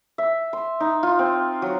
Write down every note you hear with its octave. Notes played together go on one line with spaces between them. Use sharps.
E5
C6
D#4
F4
C4
F#3